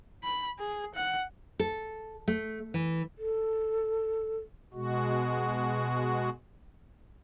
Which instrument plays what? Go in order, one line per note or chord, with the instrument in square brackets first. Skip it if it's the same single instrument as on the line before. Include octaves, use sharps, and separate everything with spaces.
[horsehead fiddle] B5
G#4
F#5
[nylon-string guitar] A4
A3
E3
[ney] A4
[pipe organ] B2 G#3 F#4